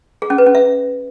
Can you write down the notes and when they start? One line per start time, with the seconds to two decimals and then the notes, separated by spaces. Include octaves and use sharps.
0.22 G#4
0.30 C#4
0.38 B4
0.47 C#4
0.55 E5